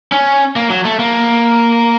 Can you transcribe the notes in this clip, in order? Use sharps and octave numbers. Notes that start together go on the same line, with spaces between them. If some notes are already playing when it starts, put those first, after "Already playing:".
C#4
A#3
F#3
A3
A#3